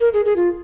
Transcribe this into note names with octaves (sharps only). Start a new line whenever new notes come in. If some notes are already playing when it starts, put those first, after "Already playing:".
A#4
G#4
G#4
F4